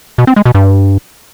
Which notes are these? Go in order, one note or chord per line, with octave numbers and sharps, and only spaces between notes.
B2
C4
G#3
B2
G2